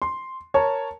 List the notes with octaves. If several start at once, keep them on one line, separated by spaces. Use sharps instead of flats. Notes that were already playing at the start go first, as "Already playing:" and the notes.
C6
A#4 C#5 A5